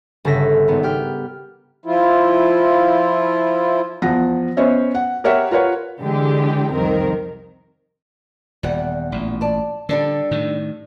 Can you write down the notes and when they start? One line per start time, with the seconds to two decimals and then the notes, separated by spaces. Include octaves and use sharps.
0.25 G1 C#3 A4 E5 A#6
0.68 G#1 B3
0.83 G4 G5 F6
1.86 F3 E4 F4
4.02 E2 F3 F#5 A#6
4.57 B3 C#4 C5 C#5 D#5 E5
4.95 F#5
5.24 G4 A#4 C#5 E5 F#5
5.51 F4 A#4 B4 C#5 F#5
6.00 D3 E3 G#3 G4
6.72 C2 F2 D#3 C4 A#4
8.63 D#1 E2 G3 F#5
9.12 A1 A#2
9.41 D5 A5
9.89 D3 G3 D4 A4
10.31 A2 D#3